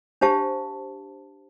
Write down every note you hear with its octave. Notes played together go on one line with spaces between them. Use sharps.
D4 G4 C5 F5 A5